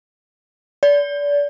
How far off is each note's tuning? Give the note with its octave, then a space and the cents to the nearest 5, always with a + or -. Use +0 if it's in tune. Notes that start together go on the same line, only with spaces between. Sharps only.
D5 -30